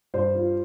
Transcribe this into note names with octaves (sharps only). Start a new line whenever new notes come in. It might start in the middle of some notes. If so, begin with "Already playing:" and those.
G2 C5
F4